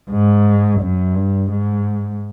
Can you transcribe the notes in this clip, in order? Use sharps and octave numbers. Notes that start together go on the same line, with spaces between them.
G#2
F#2
G2
G#2